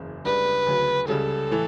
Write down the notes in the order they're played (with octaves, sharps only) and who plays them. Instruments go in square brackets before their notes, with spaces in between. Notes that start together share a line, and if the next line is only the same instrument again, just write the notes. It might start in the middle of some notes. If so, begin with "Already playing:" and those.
Already playing: [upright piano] F#1 E2 C#3
[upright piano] C#2 C#3 G3 D4 [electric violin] B4
[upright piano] D2 C#3 F#3
[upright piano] C#2 C#3 G3 [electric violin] A4
[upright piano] A2 E3 A3